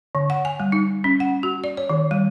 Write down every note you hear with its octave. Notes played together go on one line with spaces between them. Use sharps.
D3
F#5
G#5
G3
D#4
C#4
F#5
F#4
D5
C#5
D#3
G3